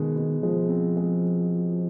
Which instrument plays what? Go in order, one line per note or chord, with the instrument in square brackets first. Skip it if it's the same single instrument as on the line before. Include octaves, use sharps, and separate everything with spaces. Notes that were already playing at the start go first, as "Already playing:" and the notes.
Already playing: [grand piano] B2 G#3 [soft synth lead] D#3
[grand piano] B2
[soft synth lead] F3 [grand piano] G#3
[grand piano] C4
G#3